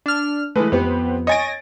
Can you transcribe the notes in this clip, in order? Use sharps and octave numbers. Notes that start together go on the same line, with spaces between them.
D4 F6
E3 G#3 A3 B4
F2 B3 C4 G4 B4
C#5 D#5 G#5 A6 A#6 D7